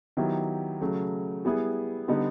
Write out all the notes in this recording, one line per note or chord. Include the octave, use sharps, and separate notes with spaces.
D#3 F#3 B3 E4 G4
C#3 F#3 A3
G3 B3 E4 G#4
D3 G3 B3 D#4